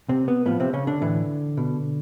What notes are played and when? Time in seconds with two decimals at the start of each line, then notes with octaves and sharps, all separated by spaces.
0.09 C3 C4
0.28 B3
0.46 A2 F3 B3
0.60 C3 C4
0.73 C#3 C#4
0.87 D3 D4
1.01 A2 E3
1.57 B2